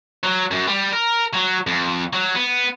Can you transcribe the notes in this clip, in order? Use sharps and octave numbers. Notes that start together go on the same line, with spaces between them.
F#3
F#2
G3
A#4
F#3
F2
F#3
B3